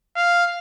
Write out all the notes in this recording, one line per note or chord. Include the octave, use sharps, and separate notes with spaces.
F5